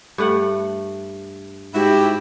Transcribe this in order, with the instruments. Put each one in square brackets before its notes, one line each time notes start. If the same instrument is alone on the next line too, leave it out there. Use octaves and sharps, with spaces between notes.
[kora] G2 A3 F#5
[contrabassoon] G#2 [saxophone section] E4 F#4 [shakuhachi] G4